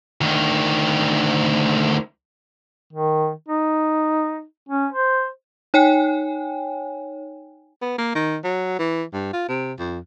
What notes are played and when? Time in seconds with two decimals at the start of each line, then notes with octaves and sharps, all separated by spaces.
0.21 D2 D#3
2.93 D#3
3.49 D#4
4.69 C#4
4.92 C5
5.74 D#4 C#5 G5 G#5
7.82 B3
7.98 A#3
8.15 D#3
8.44 F#3
8.79 E3
9.13 G2
9.33 F4
9.49 C3
9.79 F2